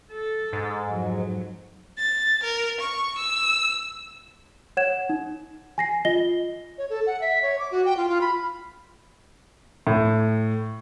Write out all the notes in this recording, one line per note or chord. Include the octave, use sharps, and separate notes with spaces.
A4
G#2
F2 F#3
A6
A#4
C#6
E6
C#5 F#5 G#6 E7
D#4
G#5 A#6 C7
F4 D#5 A#6 G7
C#5
A4
F#5
E5
C#5
D6
F#4
G5
F4
F4
B5
A2